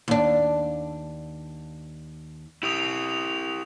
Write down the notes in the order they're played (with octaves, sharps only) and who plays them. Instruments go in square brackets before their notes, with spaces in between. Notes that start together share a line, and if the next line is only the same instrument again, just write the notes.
[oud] D#2 D4
[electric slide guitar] E4 G4 [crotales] D#6 F7